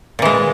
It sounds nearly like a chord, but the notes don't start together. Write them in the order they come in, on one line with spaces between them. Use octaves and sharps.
A#2 E3 G#3